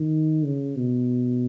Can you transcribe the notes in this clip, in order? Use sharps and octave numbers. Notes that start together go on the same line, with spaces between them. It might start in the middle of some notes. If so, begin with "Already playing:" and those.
Already playing: D#3
C#3
B2